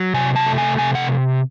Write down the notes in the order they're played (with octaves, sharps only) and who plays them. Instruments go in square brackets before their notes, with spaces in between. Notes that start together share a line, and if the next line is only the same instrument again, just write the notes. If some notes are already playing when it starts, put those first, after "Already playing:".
Already playing: [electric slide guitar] F#3
C3 G#5
A5
A3
G#5
C3 G#5
F#5